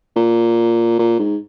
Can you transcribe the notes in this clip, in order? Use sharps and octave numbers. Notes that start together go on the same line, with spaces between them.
A#2
A#2
G#2